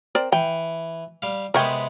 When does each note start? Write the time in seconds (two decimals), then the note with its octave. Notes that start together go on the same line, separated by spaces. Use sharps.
0.15 C4 A#4 D5
0.32 E3 G5
1.22 G3 F5
1.54 C3 G#3 B3 A#4 C#5 G5